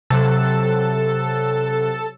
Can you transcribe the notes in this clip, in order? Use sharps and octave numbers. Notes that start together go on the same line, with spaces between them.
C3 F#3 A4 F#6